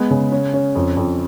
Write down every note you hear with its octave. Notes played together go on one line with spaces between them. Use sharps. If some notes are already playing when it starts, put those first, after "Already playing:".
Already playing: G#3 B3
C#3
C#4
C#4
F2
F2